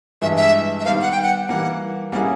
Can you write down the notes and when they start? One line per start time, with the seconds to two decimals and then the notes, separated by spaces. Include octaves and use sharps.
0.22 G2 E3 G#3 E5
0.37 E5
0.80 E5
0.85 D#3 G3 B3 F5
1.01 F#5
1.11 G5
1.22 F#5
1.48 E3 G3 A#3 F#5
2.12 G3 A#3 C#4 E4 G#4 F#5